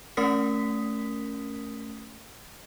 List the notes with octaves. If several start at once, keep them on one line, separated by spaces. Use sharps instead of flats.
A3 C#4 A#4 D#6 B6